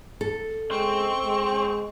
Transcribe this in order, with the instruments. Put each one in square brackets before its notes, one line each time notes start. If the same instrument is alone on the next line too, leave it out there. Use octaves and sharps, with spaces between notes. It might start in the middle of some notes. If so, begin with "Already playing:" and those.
[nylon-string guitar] A4
[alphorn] G#3 [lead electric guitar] C4 [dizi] C#6
[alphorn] G#3